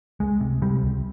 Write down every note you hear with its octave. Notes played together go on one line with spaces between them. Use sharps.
C#2 G#3
C3
C3 G3
C#2